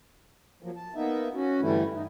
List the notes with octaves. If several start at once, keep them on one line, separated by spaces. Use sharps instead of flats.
F3 F#3 A#3
A5
A#3 B3 D#4 E5
C#4 F#4
G2 D3 E3 G3 A3 E4
D#4